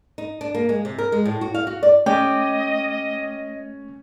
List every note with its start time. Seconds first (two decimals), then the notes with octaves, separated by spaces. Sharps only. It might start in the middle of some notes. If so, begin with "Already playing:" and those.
0.18 D#4
0.41 D4
0.54 A#3
0.69 G#3
0.85 C3
0.98 A#4
1.12 G#3
1.25 A2
1.41 F#4
1.55 F5
1.67 F#4
1.83 D5
2.06 A3 C#4 G4 D#5